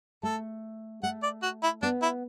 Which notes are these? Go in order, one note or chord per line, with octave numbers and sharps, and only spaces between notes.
A3 A4
A3 F#5
D5
F#4
E4
B3 D4
E4